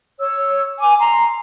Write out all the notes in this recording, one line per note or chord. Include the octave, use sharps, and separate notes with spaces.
C#5 E6
G#5 D6
A#5 C6